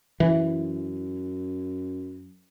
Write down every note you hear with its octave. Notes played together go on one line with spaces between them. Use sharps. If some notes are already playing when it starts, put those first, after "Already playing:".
F#2 E3